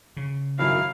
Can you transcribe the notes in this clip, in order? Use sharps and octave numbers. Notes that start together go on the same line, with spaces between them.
C#3
G#1 F#2 D#3 F#3 E4 F5